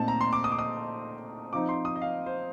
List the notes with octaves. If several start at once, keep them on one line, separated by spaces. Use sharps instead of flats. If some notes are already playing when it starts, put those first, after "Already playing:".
Already playing: A#2 A3 C4 D#4 A5
A#5
C6
D6
D#6
D6
D#6
F3 C4 D#4 D6
C6
D#6
D#5
F5
C5